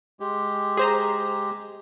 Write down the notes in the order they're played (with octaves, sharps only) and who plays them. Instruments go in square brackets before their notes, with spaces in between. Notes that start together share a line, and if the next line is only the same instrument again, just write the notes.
[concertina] G#3 G4
[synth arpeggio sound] G#4 C5 A#5